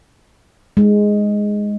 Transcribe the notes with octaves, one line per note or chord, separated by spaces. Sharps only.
G#3